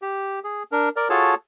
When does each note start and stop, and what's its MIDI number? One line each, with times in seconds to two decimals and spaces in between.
0.02 0.39 67
0.44 0.63 68
0.72 0.89 62
0.72 0.89 70
0.96 1.08 70
0.96 1.08 74
1.10 1.35 65
1.10 1.35 66
1.10 1.35 68
1.10 1.35 69
1.10 1.35 73
1.10 1.35 81